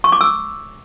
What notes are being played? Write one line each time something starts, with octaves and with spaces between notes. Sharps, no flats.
C#6
D6
E6